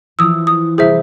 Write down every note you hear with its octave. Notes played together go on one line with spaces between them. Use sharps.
E3 F3 E4 D#6 E6
D#6
C3 G3 E4 G#4 C5 E5